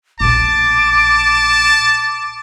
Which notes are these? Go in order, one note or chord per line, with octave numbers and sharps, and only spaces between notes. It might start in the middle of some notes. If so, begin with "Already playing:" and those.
A#1 B2 A5 D6